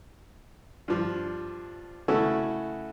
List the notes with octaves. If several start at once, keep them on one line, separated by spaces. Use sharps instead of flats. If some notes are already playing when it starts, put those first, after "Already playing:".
G2 F3
C#3 A3 C#4 E4 F#4 A4